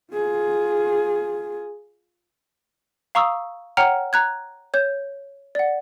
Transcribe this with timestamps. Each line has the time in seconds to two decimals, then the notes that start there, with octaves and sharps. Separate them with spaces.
0.13 F4 G#4
3.15 F5 A#5 C#6 D#6 E6
3.77 C#5 F#5 G5 A#5 F6
4.13 A#5 F#6 G#6
4.74 C#5 G6
5.55 D5 F#5